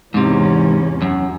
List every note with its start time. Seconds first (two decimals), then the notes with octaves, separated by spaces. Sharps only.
0.14 E2 G#2 C3 C#4
1.02 F#2